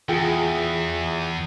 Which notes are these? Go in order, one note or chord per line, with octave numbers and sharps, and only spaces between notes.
E2 F4 G#4 G5